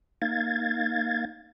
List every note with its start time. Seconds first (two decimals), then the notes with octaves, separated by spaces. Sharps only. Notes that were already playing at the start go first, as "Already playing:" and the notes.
0.22 A#3 D#4 F5 G#6 A6